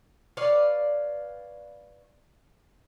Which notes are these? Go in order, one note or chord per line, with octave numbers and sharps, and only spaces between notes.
B4 C#5 D5 F5